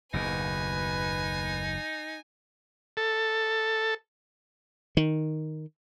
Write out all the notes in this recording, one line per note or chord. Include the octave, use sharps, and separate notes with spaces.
F#1 D#2 B2 D#4 B4 G#5
A4
D#3